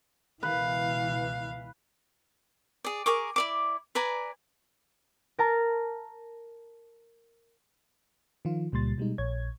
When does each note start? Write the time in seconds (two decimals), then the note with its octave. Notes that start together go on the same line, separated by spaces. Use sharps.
0.43 C#2 B2 E3 B4 F5
2.84 G#4 D5
3.06 G#4 A#4 C#6 D6
3.36 E4 D5 D6
3.95 B4 D5 G#5 A#5
5.39 A#4 A5 A#5 F6
8.45 D#3 F3 F4
8.72 C#2 A#2 G3 C6 A6
8.98 B2 G3 G#3 D#4
9.18 A#1 C#5 G#6